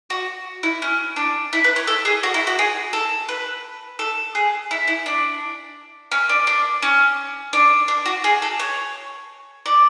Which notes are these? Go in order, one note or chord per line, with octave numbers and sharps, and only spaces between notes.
F#4
E4
C#4
D4
E4
B4
C#5
A4
G#4
F#4
E4
F#4
G#4
A4
B4
A4
G#4
E4
E4
D4
C#4
D4
D4
C#4
D4
D4
F#4
G#4
A4
C#5
D5